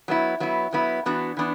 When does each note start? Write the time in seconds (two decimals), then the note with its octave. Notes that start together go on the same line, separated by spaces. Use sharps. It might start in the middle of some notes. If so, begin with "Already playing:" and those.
0.08 F#3 B3 E4
0.40 F#3 B3 E4
0.72 F#3 B3 E4
1.06 E3 B3 D4 F#4
1.37 E3 B3 D4